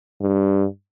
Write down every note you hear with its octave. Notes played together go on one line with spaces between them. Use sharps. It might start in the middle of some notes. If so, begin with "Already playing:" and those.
G2